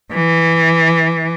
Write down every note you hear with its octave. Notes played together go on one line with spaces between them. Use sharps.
E3